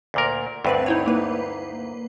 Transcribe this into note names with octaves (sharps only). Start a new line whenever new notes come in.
D2 A#2 A#4
D2 G2 C4 B4 D5
D#4 E4 C#5
A#3 B4